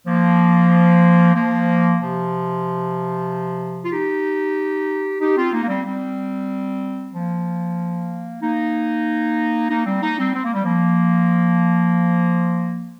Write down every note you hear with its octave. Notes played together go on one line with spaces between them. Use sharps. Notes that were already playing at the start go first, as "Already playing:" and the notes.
F3 A#3
F3 A#3
C3 F3
F4
D#4 G4
D#4 G4
C4 F4
A#3 D#4
A#3
G3 C4
G3 C4
F3 A#3
A#3 D#4
A#3 D#4
G3 C4
A#3 D#4
G3 C4
C4
A#3
G3
F3 A#3